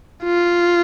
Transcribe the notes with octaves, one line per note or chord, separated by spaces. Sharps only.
F4